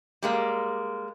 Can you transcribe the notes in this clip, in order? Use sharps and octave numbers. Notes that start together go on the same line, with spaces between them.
G3 G#3 A#3